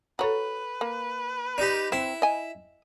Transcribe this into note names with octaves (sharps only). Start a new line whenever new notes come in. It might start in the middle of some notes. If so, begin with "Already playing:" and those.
F#4 A4 B4 C#5 A#5
A#3
D#4 G4 D5
C4 E4
D#5 G#5